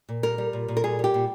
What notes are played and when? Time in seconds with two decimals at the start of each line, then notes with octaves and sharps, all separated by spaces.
0.09 A#2
0.23 G3 A#4
0.38 G3
0.53 A#2
0.68 A#2
0.77 A#4
0.84 G3 G#4
0.99 G3 G4
1.14 A#2